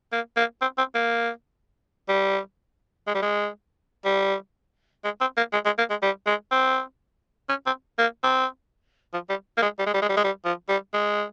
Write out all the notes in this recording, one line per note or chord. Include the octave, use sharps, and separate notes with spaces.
A#3
A#3
C4
C4
A#3
G3
G#3
G3
G#3
G3
G#3
C4
A#3
G#3
G#3
A#3
G#3
G3
G#3
C4
C#4
C4
A#3
C4
F3
G3
A#3
G#3
G3
G#3
G3
G#3
G3
G#3
G3
F3
G3
G#3